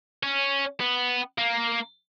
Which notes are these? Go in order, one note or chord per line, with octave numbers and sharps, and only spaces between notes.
C#4
B3
A#3